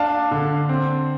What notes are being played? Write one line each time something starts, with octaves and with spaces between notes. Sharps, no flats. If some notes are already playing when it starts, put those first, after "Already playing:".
Already playing: D4 F5 A5
D3
C4